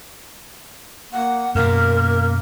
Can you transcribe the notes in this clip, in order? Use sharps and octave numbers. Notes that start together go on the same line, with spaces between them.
A#3 F#5
F#2 B2 A#3 A#4